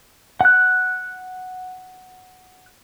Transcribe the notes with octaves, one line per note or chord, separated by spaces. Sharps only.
F#5 F#6